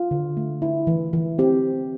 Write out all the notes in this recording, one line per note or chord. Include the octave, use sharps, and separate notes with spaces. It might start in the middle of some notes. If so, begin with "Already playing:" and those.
Already playing: F4
D3
A3
E4
E3
E3
C4 G4